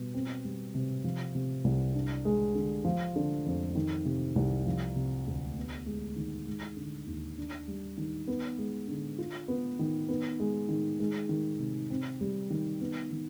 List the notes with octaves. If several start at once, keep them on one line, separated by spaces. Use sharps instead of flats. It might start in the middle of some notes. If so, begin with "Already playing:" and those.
Already playing: B2 G3
C4
G3
C3
F3
C3
C2
D4
G#3
D3
F3
D3
F2
D#3
C3
C2
F3
C3
D2
B3
G#3
D#3
G#3
D3
D#2
D4
G3
D#3
B3
G#3
D3
F4
B3
D#3
B3
G#3
D#3
G#3
D#3
C3
C4
G3
D#3
B3
D#3